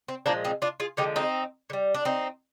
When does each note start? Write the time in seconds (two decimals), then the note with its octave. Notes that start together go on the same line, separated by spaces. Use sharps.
0.08 C4
0.26 A#2 F3 G#3 A#3 D4
0.45 C4 D#4
0.62 D4 F4
0.80 F4 G#4
0.97 D3 F3 G#3 D#4 G4
1.16 C4 D#4
1.70 D3
1.73 G3
1.94 D4
2.05 C4 D#4